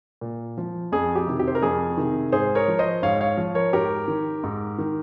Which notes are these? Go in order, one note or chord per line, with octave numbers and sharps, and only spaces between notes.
A#2
F3
F2 G#4
G4
C3 D#3
G4
C5
A#4
F2 G#4
C3 D#3
G#2 G#4 C5
A#4 C#5
F3
C5 D#5
G#2 C#5 F5
C#5 F5
F3
A#4 C#5
G#2 G4 A#4
D#3
G#2
D#3